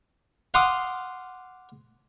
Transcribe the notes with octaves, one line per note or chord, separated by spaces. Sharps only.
F5 F#5 C6 D6 D#6